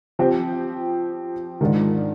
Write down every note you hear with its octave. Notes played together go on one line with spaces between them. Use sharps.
F3 C4 G4
G#2 D#3 G#3 D4 F4